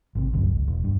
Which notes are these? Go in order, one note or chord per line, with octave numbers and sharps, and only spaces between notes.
G#1 C3
G1 C#2 F#2
C#2
E1
G2